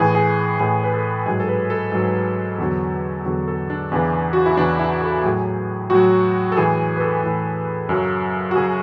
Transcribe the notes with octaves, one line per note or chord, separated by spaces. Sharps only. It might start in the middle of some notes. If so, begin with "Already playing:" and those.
Already playing: A2 E3 G#4
G#4
A2 E3 G#4
B4
A4
G#2 F#3 G#4
A4
B4
A4
G#2 F#3
E2 D3 F#3
E2 D3 F#3
A4
D4
E2 C#3 E3 D4
F#4
E4
E2 C#3 E3 D4
E4
A4
A2 F#3 G#4
A2 F#3 F#4
A4
A2 E3 G#4
B4
A4
A2 E3
F#2 C#3 F#3
F#4
C#3 F#3 G#4